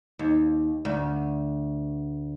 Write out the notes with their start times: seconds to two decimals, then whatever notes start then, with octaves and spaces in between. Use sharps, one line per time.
0.19 D#2
0.85 D2